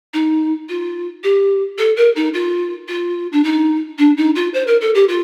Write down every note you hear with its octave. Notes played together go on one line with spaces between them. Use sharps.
D#4
F4
G4
A4
A#4
D#4
F4
F4
D4
D#4
D4
D#4
F4
C5
A#4
A4
G4
F4